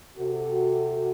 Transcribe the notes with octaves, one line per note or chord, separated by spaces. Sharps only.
C3 F#4 A4